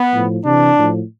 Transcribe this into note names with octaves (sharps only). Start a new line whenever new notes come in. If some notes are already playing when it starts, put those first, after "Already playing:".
Already playing: B3
A2 F3
C3 E3 D4
A2 F3